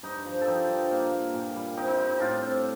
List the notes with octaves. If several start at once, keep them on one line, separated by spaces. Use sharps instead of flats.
G2 D#4
F3
A4
F3 D#4 G4
G2
A#3
A#3
A#2
G3
C4 D#4 G4
D#4
G3 D#4
D#4
A2 D4 F4
C4